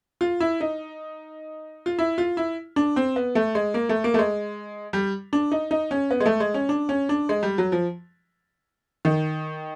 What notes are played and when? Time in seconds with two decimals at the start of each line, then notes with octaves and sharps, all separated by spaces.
0.21 F4
0.40 E4
0.61 D#4
1.86 F4
1.99 E4
2.18 F4
2.37 E4
2.76 D4
2.96 C4
3.16 B3
3.35 A3
3.55 G#3
3.74 A#3
3.89 A3
4.04 A#3
4.14 A3
4.19 G#3
4.93 G3
5.33 D4
5.52 D#4
5.71 D#4
5.91 C#4
6.11 B3
6.20 G#3
6.26 A3
6.40 G#3
6.54 C#4
6.69 D4
6.89 C#4
7.09 D4
7.29 G#3
7.43 G3
7.58 F#3
7.72 F3
9.05 D#3